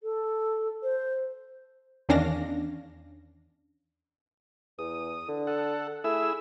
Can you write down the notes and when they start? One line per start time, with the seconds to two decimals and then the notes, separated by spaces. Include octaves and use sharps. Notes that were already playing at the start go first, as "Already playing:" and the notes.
0.02 A4
0.82 C5
2.09 E2 D#3 C#4 D4 F5 A#6
4.79 E2 D#6
5.29 D3
5.47 A4 F#5
6.04 A3 E4 G#4 E6